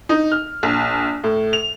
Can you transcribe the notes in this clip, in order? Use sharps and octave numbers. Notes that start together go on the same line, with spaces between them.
D#4
F6
A#1
A2
F7